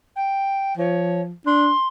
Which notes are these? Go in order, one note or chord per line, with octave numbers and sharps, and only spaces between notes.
G5
F3 C#5
D4 C6